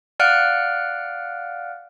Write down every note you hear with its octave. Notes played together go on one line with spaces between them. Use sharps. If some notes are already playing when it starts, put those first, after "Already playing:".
D5 F5 F#5 F6 F#6 D7